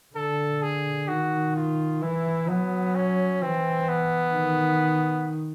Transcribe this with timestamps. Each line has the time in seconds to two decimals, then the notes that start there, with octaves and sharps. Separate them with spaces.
0.15 D3 A4
0.62 G#4
1.08 D#3 F#4
1.56 F4
2.02 E3 E4
2.49 F#3 B3
2.95 C#4
3.42 E3 C4
3.89 B3
4.35 D#3